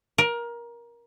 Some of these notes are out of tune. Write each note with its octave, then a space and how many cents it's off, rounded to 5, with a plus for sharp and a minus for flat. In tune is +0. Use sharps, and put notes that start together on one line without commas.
A#4 +20